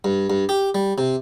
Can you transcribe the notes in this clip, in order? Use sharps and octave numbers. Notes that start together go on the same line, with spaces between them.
G2
G2
G4
G3
C3